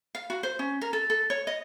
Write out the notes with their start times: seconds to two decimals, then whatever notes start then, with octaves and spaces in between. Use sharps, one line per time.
0.15 F5
0.30 F#4
0.43 C5
0.59 C#4
0.81 A#4
0.93 A4
1.10 A4
1.30 C#5
1.47 D#5